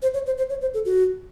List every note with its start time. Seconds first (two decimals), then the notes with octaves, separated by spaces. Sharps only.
0.02 C5
0.14 C#5
0.26 C5
0.38 C5
0.50 C#5
0.61 C5
0.74 A4
0.85 F#4